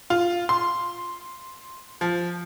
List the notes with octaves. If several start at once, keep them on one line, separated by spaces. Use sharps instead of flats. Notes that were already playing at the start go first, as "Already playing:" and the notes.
F4
C6
F3